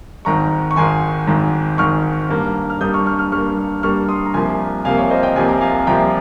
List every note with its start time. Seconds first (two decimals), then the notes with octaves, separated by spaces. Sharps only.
0.25 G#1 G#2 D#3 A#5 C#6
0.71 C#6
0.76 G#1 G#2 D#3 G#5 C6
1.27 G#1 G#2 D#3
1.78 G#1 G#2 D#3 C#6 F6
2.29 G2 G3 A#3
2.70 F6
2.81 G2 G3 A#3 D#6 G6
2.94 C#6 F6
3.06 C#6 F6
3.19 C#6 F6
3.32 G2 G3 A#3 C#6 F6
3.83 G2 G3 A#3 C#6 F6
4.09 C6 D#6
4.26 A#5
4.34 C2 C3 F3 A#3 G#5 C6
4.85 C2 C3 F3 A#3 F5 G#5
4.98 C#5
5.10 C5 D#5
5.23 D#5 G5
5.36 C2 C3 F3 A#3 G#5
5.48 A#5
5.61 F5 G#5
5.87 C2 C3 F3 A#3 G5 A#5